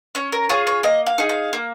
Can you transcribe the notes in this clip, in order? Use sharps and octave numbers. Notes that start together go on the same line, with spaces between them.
C#4 C#5
A#4
F4 G#4 C#5
C#5
A#3 D#5
F5
D#4 G#4
F5
A#3